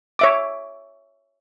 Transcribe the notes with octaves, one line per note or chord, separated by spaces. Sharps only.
C#5 E5 D6